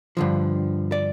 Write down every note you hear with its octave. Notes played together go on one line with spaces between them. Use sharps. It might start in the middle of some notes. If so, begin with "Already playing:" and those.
G2 D3 F3
D5